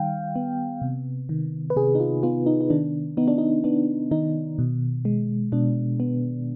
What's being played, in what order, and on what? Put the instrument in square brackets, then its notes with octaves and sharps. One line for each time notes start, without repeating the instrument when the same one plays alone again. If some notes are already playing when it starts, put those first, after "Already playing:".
Already playing: [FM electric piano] D#3 G3 F5 G5
B3
C3
D#3
B4
C3 G#4
D#4
F4
B3 F4
D#4
D#4
D#3 D4
B3 D#4
D4
D#4
B3 D4
D#3 D#4
B2
G#3
B2 D4
B3